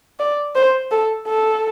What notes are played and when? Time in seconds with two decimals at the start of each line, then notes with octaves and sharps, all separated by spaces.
0.20 D5
0.55 C5
0.91 A4
1.27 A4